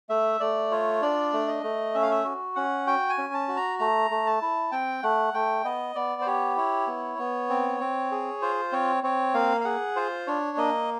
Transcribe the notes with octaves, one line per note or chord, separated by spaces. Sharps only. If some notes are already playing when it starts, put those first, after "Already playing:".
A3 E5
A3 D5
F4 C#5
D4 D5
A3
D#5
A3
C#4 E5
F5
E5
F#4
C#4 F#5
F#4 G5
G#5
C#4
A5
F#4
A#5
A3 A#5
A3
A5
E4
C4 G5
A3 F#5
A3 G5
B3 D#5
B3 D5
C5
G4 C#5
E4 C#5
B3
B3
C4
C4
G#4
F4 C5
C4 C#5
C4 C#5
A#3 F5
F5
G#4 F#5
F4 C5
D4 C#5
A#3 D#5